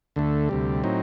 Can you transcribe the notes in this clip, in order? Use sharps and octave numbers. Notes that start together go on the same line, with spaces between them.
D2 D3 A3
D2 C3 G3
A2 F#3 C4 D#4